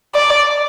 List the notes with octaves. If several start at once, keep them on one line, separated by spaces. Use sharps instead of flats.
D5